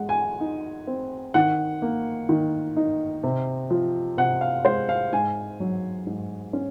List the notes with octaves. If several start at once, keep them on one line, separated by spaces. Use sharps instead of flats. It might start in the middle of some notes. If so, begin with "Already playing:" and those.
Already playing: G#3 F#5
G#5
D#4
C4
D#3 F#5
A#3
D#3
D#4
C3
F3
C3 F#5
F5
G#3 C5
F5
G#2 G#5
F#3
G#2
C#4